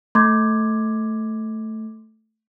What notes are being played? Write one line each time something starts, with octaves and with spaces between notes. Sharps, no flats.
A3 C6 D6 G#6